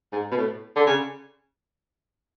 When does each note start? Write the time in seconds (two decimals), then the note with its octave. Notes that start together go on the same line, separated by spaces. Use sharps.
0.12 G#2
0.31 B2
0.37 A2
0.76 D3
0.87 C#3